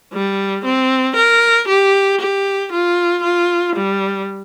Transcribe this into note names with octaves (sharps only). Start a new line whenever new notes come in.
G3
C4
A#4
G4
G4
F4
F4
G3